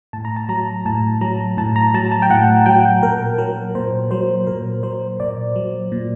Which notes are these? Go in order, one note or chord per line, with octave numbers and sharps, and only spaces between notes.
A2 A5
A#5
A5
F#3 A#5
A2 A5
F#3 A#5
A2 A5
A#5
F#3 A5
A5
G5
A2 F#5
F#3 G5
A#2 A#4
F#3 A#4
A#2 C5
F#3 C5
A#2 A#4
F#3 C5
A#2 D5
F#3
A#2